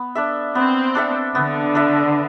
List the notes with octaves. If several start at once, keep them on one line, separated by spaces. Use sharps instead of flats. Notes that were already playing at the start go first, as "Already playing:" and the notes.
Already playing: B3
D4 A4 E5
B3 C4
D4 A4 E5
D3 B3
D4 A4 E5